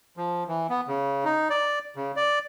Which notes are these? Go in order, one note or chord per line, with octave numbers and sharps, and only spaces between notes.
F3
E3
B3
C#3
D#4
D5
C#3
D5